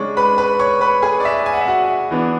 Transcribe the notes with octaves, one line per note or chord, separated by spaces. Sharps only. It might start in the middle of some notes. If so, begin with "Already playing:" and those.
Already playing: C#3 G#3 D4 C#5 C#6
B4 B5
B4 B5
C#5 C#6
B4 B5
G#4 G#5
D5
E5
G#5
F#5
E5
F#4 F#5
E3 B3 D4